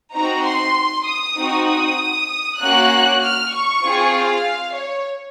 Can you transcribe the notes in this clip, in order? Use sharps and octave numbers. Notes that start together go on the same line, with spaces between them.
C4 D#4 F#4 A#5
C6
D#6
C4 D#4 F#4
D#6
A#3 C#4 F#4 F#6
F6
C#6
C4 F4 G#4
F5
C#5